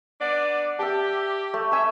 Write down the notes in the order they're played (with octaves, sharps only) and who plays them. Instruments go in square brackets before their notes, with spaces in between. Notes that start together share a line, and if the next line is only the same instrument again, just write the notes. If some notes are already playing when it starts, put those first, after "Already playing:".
[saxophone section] B3 D4 D5
[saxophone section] G4 [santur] E5 A5
[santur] A3
[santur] C#5 G#5 [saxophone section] E5